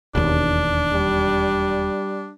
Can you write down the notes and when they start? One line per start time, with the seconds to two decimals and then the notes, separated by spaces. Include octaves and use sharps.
0.15 E1 D#2 D4
0.93 G3